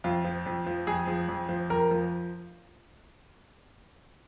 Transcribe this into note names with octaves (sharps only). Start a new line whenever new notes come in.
F2 F4
F3
F2
F3
F2 G#4
F3
F2
F3
F2 A#4
F3